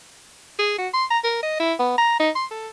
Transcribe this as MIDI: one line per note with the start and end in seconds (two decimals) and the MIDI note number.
0.59 0.76 68
0.78 0.88 66
0.93 1.05 84
1.10 1.19 82
1.24 1.42 70
1.43 1.58 75
1.60 1.73 64
1.79 1.94 59
1.98 2.18 82
2.20 2.30 63
2.35 2.46 84
2.51 2.68 69